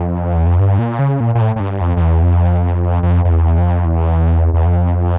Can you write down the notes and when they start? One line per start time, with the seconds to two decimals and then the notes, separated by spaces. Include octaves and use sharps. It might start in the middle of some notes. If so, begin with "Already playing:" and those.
Already playing: F2
0.35 E2
0.46 F2
0.59 G2
0.79 A#2
0.99 C#3
1.20 A#2
1.35 A#2
1.41 A2
1.56 A2
1.60 G2
1.81 F2
1.97 F2
2.01 E2
2.22 F2
3.03 F2
3.25 F2
3.31 E2
3.58 F2
3.85 E2
4.54 E2
4.66 F2